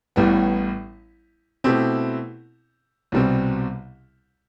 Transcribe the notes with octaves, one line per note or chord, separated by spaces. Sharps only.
A1 A2 G3 B3
B2 A3 C4 E4 G4
C2 B2 G3 C4